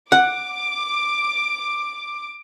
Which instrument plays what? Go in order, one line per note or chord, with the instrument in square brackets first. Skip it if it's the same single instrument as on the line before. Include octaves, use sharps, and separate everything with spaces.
[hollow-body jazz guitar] F#5 [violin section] D6